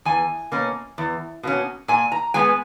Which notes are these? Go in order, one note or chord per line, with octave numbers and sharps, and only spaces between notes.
E2 G#5
B2 A#3 C#4
E2
B2 A#3 C#4
A#2 G#5
A#5
G#3 B3 G#5